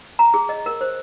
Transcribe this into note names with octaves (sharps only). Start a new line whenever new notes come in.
A#5
G#4
D#5
A#4
C5